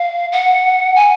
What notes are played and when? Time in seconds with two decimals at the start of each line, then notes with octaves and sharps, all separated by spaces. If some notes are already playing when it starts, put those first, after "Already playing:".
Already playing: F5
0.32 F#5
0.96 G#5